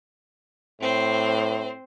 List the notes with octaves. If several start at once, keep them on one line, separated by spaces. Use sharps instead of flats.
A2 C4 C5